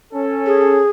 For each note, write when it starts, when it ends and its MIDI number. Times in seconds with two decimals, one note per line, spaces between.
0.13 0.81 61
0.13 0.81 69
0.46 0.90 68